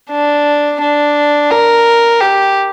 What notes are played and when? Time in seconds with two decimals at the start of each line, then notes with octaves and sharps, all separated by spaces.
0.11 D4
0.80 D4
1.51 A#4
2.21 G4